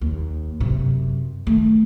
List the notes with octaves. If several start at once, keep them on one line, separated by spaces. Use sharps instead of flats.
D#2
F#2 C3
D#3 A3